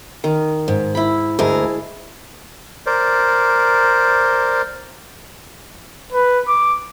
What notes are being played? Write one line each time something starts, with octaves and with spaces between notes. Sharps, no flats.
D#3
G#2
E4 B5
D2 G#3 E4 A#4 A5
A#4 C5 D5
B4
D6